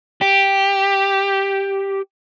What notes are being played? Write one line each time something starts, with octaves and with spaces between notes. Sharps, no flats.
G4